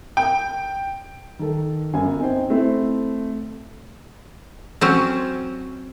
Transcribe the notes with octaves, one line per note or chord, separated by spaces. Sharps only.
G5
D#3 A4
G1 F#2 G#5
C4 D#4 C5 G5
A3 C4 E4
F#3 C4 C#4